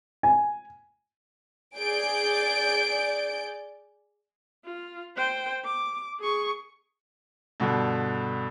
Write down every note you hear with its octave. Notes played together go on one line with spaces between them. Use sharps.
G#5
G#4 D5 G6 D7
F4
C5 G5
D6
G#4 C#6
G2 B2 D3